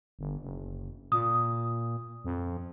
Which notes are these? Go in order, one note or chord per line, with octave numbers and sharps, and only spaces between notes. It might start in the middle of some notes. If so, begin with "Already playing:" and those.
G1
F#1
A#2 D#6
F2